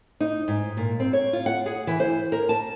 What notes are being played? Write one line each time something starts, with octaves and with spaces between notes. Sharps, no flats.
D#4
G#2
A#2
C4
C#5
F4
F#5
G#4
E3
C5
A#4
A5